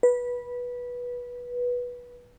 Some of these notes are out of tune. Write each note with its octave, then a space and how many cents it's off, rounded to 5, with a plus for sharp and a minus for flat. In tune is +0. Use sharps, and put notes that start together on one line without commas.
B4 -15